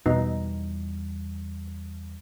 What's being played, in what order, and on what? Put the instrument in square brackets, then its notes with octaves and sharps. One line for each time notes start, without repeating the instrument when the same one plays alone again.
[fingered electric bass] E2 G3 [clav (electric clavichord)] B2 [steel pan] D#4